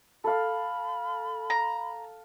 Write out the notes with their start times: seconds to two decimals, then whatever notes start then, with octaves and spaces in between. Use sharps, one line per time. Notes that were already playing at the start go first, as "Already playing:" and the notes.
0.24 A4 F5 B5
1.50 A#5